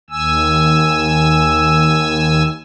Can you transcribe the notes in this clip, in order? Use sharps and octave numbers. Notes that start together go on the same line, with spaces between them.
D#2 G#5 E6